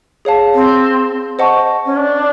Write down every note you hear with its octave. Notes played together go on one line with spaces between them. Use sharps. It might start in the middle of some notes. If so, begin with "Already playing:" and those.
G#4 C#5 F5 A5
C4
C5 D#5 F#5 A5 C#6
C#4
D4